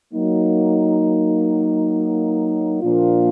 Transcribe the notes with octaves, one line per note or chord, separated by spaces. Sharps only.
F#3 A#3 D#4
A#2 F3 A#3 D4 F4